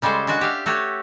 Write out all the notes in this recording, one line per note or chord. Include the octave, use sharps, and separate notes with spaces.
C#3 G3 G#3 A4 C5
G#3 D4 F#4 F#5
G4 E5 F5
A3 F#4 G4 C#5